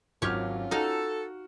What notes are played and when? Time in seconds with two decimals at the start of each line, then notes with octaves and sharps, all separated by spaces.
0.22 G#1 F#3 C#4 F4 G4 C#5 F6
0.71 D#4 F#4 A4 F5